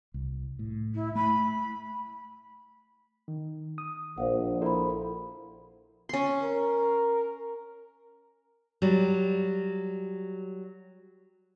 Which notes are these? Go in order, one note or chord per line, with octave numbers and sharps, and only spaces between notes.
C2
A2
E4
A3 B5
D#3
D#6
A#1 C5 F5 F#5
E4 A4 A#4 C5 B5
C#4 C6
A#4
F#3 G3